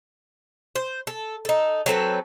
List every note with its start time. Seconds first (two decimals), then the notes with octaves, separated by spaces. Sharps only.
0.76 C5
1.07 A4
1.45 D#4 A4
1.86 F#3 C4 A4 B4